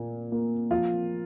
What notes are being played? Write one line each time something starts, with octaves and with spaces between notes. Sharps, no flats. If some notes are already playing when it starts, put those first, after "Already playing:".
Already playing: A#2 A#3
A#3
F3 F4